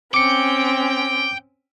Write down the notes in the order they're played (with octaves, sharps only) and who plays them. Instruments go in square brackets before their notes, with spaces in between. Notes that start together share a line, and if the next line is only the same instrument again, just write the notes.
[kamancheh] C4 C#4 [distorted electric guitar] G5 [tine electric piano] D6 C#7